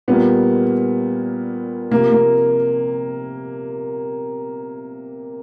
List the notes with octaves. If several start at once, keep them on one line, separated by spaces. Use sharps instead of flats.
A#2 G3 A#3 B3
C3 F3 A#3
A#3